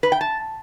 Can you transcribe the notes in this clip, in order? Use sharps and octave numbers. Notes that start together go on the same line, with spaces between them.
B4
G5
A5